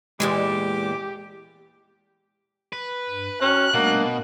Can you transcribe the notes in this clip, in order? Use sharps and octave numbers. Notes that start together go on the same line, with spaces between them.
E2 A#2 E3 G#3 G4 D6
B4
G2
C#4 F#4 G5 F6 F#6
B2 G3 A3 A#3 D4